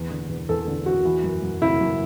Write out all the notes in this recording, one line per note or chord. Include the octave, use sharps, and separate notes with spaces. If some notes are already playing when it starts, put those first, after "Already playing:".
Already playing: E2
D3
E2
E2 A4
D3
E2 F#4
E3
F#2
F#2
C#3 E4
F#2